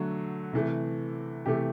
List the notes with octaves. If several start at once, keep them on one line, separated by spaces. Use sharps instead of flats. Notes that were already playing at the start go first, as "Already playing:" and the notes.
Already playing: D3 F#3 A3
C3 E3 A3
C3 E3 A3 G4